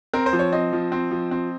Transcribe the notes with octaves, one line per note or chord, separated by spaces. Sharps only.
C4 A#4
C5
F3
C#5
C4 D#5
F3
C4
F3
C4